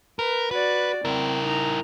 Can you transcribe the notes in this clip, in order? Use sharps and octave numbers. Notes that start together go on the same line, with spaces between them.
A#4 B4
F#4 B4 D5
C4 E4 A#4
D#4 A#5